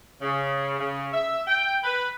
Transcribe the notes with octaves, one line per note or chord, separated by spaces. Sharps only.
C#3
C#3
E5
G5
B4